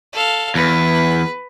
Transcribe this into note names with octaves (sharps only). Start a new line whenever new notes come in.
A4 F5
E2 B4